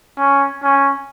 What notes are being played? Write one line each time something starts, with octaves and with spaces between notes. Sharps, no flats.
C#4
C#4